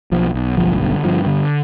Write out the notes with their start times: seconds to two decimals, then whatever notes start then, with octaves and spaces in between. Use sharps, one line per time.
0.12 B1 F3
0.34 B1
0.57 G1 F3
0.82 D3
1.04 G2 F3
1.26 D3